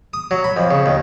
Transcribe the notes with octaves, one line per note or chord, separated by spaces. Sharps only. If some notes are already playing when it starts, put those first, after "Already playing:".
D#6
F#3
B5
F2
C#3
D#2